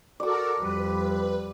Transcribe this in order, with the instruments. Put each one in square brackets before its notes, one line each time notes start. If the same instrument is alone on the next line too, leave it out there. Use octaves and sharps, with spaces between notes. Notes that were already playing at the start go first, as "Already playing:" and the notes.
[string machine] F#4 A4 A#4 [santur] D5 D6
[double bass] F2 G3 [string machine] B4